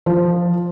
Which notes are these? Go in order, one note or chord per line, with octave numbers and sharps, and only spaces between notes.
F3